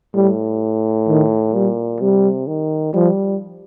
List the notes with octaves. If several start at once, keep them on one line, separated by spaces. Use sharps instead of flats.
A2 G3
D#3
A#2 G3
C3 G3
D#3
F3 G3